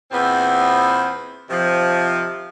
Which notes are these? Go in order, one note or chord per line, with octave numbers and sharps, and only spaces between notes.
E2 A#2 B3 C4
C3 D#3 F3